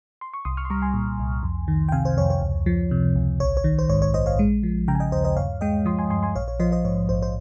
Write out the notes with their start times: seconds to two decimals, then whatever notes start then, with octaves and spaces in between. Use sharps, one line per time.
0.21 C6
0.34 C#6
0.45 C2 C6 D#6
0.57 C#6 F6
0.65 C6
0.70 G3 A#5 C#6
0.82 G#5 C6
0.94 A#2
1.19 C2
1.43 F2
1.68 D#3
1.89 G5
1.92 C3 F5 G#5
2.05 C5
2.17 F2 C#5
2.30 C#5
2.42 C#2
2.66 F3
2.91 C3
3.16 C#2
3.40 A#1 C#5
3.57 C#5
3.64 D#3
3.79 C5
3.89 G#2 C#5
4.02 C#5
4.14 A#1 C5 D#5
4.26 C#5 F5
4.39 G#3
4.63 F3
4.88 C#3 G5 A#5
4.95 G#5
5.00 D#5 G5
5.12 D#2 C5 D#5
5.24 C5 D#5
5.37 G2 C#5 F5
5.61 G#3 D#5 G5
5.85 F3 C6 D#6
5.99 G#5 C6
6.10 G2 G#5 C6
6.23 G#5 C6
6.36 A#1 C#5 F5
6.48 C#5
6.60 F3 C5 D#5
6.72 C5 D#5
6.85 G#2 C#5
7.09 A#1 C5
7.22 C5